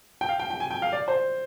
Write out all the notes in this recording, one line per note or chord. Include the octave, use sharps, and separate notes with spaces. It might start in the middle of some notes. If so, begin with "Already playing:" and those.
G5
F5
G5
G5
G#5
G5
F5
D5
C5